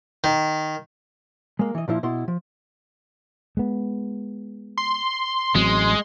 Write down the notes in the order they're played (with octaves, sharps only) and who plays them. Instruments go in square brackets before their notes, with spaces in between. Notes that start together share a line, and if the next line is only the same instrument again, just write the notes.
[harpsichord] D#3
[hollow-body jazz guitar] G#3 A#3
E3 D#5
A#2 F3 E4
B2 E4 C6
F3
[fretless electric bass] G#3 B3
[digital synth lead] C6
[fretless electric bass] A1 F#3 C4 [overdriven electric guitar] G#3